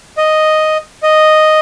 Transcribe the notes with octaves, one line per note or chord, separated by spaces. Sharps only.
D#5
D#5